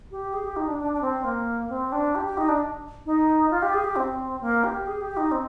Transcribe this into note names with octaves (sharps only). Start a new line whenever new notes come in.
G4
G#4
G4
D#4
D4
D4
D4
C4
A#3
C4
D4
G4
G4
D#4
D4
D#4
F4
G4
G#4
G4
C4
A#3
G4
G#4
G4
D#4
C4